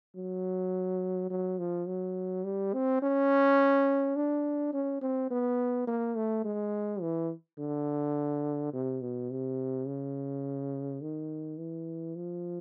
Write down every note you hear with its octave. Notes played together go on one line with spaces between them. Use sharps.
F#3
F#3
F3
F#3
G3
C4
C#4
D4
C#4
C4
B3
A#3
A3
G#3
E3
D3
C3
B2
C3
C#3
D#3
E3
F3